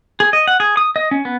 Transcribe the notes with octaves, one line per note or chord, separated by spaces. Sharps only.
G#4
D#5
F#5
G#4
D#6
D#5
C#4
B3